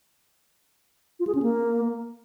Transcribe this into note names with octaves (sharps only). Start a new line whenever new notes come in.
F4
G#4
C#4
A#3